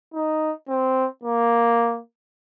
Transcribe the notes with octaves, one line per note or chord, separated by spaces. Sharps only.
D#4
C4
A#3